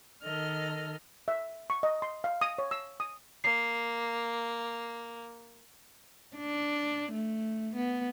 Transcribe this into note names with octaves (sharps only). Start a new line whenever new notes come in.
D#3 A4 D#5 F6
E5
C#6
D#5
C6
F5
D#6
C#5
E6
D#6
A#3 C7
D4
A3
B3